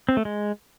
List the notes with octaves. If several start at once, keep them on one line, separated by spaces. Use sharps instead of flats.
C4
A3
G#3